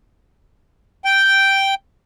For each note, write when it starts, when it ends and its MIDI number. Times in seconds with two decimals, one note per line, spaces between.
1.05 1.75 79